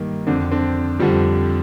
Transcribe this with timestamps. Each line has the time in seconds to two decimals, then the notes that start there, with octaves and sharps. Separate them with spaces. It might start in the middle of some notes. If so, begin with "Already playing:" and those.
Already playing: G2 D#3 A#3
0.27 F2 D3 C4 D4
0.52 C4 D4
0.99 F2 D3 F3 G3